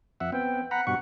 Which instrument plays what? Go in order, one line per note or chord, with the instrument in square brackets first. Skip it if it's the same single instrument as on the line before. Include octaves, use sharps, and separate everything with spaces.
[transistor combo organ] F2 E5 F#5
[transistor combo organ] B3 C4 [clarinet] G5
[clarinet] F#5 [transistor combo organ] A#5 B5
[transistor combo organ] G2 B2 C#6 [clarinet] F#5